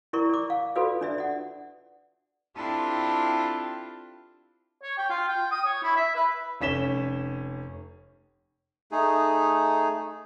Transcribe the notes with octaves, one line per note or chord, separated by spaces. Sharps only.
E4 A#4 D5 C#6
D5 D6
F5
F4 F#4 A4 B4 D5 F5
D4 D5 E5
D5 F#5
C4 D4 E4 F4 G4 A4
C#5
G5
F4
G5
D#6
C#5
E4
E5
B4
F1 C#4 B6 E7 G7
A3 D#4 G#4